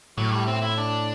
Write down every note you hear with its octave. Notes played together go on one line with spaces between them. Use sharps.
A2 F#3
G3
C4
E4
D4